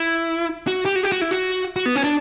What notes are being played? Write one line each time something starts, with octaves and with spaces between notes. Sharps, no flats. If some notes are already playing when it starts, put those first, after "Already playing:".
Already playing: E4
F#4
G4
F#4
G4
F#4
E4
F#4
F#4
B3
C#4
D4